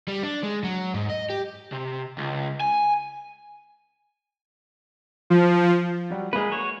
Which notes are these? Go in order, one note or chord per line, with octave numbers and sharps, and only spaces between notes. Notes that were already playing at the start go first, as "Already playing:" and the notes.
G3
D4
G#3
F#3
G#2
D#5
G4
C3
C#2
G#5
F3
F#3 G3
G#3 A#3 G#4 A#4 B4
F#4 C#5